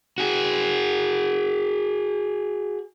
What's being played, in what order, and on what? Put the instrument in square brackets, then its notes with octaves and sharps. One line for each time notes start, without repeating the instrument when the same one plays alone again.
[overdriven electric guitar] F#4 G#4